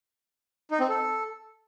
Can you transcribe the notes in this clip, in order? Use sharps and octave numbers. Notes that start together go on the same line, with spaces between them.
D#4
C4
A4